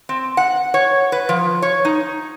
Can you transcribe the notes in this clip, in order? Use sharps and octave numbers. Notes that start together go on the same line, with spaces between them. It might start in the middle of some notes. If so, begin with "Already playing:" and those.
C4
F#5
C#5
B4
F3
C#5
D#4